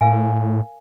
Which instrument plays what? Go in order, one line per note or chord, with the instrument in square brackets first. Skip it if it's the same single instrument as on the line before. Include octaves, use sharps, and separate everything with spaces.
[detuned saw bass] A2 [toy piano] A#4 F5 G#5